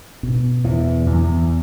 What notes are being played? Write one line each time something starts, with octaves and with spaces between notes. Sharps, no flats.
B2
E2 E3
E2